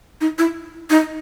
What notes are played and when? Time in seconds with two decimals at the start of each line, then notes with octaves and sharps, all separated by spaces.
0.21 D#4
0.38 E4
0.90 D#4